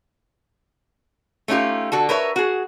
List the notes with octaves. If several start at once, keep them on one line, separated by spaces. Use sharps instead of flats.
A3 C#4 D#4 F4 G4
D3 F#4 A4
A#4 B4 C#5 E5
F#4 G#4